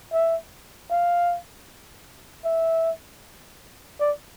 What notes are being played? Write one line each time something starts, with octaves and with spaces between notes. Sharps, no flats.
E5
F5
E5
D5